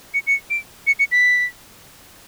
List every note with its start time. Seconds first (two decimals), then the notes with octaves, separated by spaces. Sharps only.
0.14 C#7
0.27 C#7
0.50 D7
0.87 C#7
0.99 C#7
1.11 B6